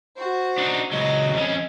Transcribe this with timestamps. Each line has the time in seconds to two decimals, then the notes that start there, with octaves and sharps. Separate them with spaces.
0.16 F#4 C5
0.58 D4 D#4
0.91 C#2 F#3 D#5
1.33 F2 C#4